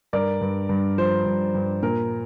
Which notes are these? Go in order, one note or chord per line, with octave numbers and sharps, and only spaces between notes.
G2 A#4 D5
G2
G2
F3 C5
G2
G2
A#2 A#4